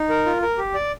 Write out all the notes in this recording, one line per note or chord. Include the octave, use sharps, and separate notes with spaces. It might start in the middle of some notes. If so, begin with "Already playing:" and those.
Already playing: D#4
A#4
F4
A#4
G4
D5